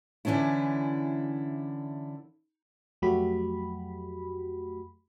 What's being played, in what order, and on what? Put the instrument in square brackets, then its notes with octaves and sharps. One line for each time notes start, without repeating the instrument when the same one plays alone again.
[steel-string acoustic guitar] D3 E3 C#4 D4 E4
[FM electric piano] F2 F#3 A3 F#4 G4 B5